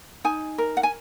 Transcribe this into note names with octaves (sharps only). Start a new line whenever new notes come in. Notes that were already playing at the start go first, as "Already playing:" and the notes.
D#4 G#5
A#4
F#5
G#5